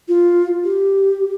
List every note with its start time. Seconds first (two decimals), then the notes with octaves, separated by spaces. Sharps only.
0.08 F4
0.64 G4